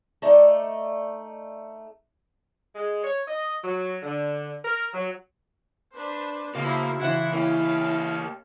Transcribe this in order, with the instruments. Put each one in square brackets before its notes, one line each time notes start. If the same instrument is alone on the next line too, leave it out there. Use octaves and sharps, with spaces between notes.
[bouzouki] A3 D#4 D5
[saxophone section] G#3
C#5
D#5
F#3
D3
A#4
F#3
[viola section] D4 B4 C5
[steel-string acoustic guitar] C#3 [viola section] F3 E4 [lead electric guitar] A#3 [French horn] F#4
[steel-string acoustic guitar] C#3 E3 [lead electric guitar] E4 [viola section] F#5 C6
[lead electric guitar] A#3 G4 [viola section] C#4 F5 [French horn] E4